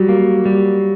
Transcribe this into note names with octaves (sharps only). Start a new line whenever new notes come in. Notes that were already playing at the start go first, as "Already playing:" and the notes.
Already playing: F#3 G3
A#3
G3